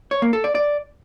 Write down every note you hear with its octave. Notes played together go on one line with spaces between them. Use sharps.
C#5
A#3
A4
D5
D5